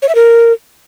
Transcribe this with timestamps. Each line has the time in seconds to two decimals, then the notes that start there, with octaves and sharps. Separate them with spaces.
0.02 C#5
0.09 E5
0.15 A#4